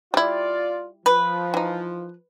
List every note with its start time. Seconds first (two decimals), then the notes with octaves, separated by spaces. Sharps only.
0.14 G3 E4 F4 D5
1.06 F3 B4
1.54 E3 D#4